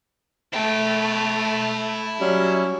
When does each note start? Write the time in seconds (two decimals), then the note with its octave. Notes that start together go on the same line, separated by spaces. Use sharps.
0.53 A3 E4 G5
2.20 F#3 G3 C#4